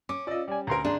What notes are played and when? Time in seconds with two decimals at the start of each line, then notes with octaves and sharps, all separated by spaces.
0.09 C#4 D6
0.27 F4 D5 D#5 E6
0.48 G3 D5 G#5
0.67 D2 A#4 A#5 C6
0.85 G#1 D4 G#4